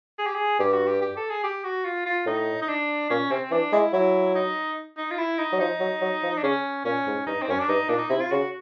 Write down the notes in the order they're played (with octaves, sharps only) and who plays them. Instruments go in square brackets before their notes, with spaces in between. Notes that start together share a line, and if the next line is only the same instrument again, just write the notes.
[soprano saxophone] G#4
G4
G#4
[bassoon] G2 [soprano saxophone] G4
[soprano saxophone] F#4
G4
G4
A4
G#4
G4
F#4
F4
F4
[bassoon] A2 [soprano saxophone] D#4
[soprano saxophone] D#4
D4
[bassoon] A#2 [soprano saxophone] C#4
[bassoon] C3 [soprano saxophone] C4
[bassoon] E3 [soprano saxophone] D4
[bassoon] G#3 [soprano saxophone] E4
[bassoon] F#3 [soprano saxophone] E4
[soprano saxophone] D#4
D#4
F4
E4
D#4
[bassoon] F#3
[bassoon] F3 [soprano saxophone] D#4
[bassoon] F#3
F#3
F3
[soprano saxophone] D4
[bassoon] C#3 [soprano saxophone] C#4
[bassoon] A#2 [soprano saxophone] C#4
[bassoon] G#2
[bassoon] G2 [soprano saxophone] D#4
[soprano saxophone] C4
[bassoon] F#2 [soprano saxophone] C#4
[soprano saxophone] D4
[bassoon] G2 [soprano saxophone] D#4
[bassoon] A#2 [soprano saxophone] D4
[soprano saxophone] D#4
[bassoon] C3 [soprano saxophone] E4
[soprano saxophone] F4
[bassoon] C#3 [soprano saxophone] F#4